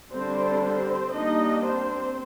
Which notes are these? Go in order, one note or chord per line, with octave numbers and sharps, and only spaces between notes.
D3 G3 C4 D4 C5
C4 C5
G3 A#3 D4 D#4 D#5
C4 C5